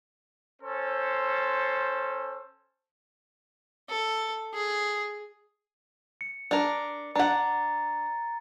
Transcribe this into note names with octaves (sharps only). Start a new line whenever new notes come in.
C#4 A4 C5
A4
G#4
C#7
D4 A#4
D4 F#5 A#5 A6